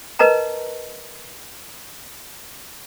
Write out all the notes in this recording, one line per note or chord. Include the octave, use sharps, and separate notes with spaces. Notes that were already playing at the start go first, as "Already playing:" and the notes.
A#4 B4 D#5 A5 A#5